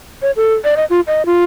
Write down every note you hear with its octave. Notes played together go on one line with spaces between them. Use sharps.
C#5
A4
D5
D#5
F4
D#5
F4